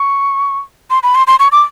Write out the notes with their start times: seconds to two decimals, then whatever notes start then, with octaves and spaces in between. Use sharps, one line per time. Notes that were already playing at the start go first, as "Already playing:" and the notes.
Already playing: C#6
0.90 C6
1.03 B5
1.15 C6
1.27 C6
1.40 C#6
1.52 D6